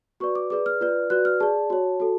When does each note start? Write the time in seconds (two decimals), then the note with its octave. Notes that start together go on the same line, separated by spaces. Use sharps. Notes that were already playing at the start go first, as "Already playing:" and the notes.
0.20 F#4 B4 D5 C#6
0.35 D6
0.50 G#4 B4 D5 D6
0.66 F6
0.81 F4 B4 D5
1.10 F#4 B4 D5 F#6
1.25 F6
1.40 G#4 D5 A5
1.70 F#4 C#5
2.00 F#4 A4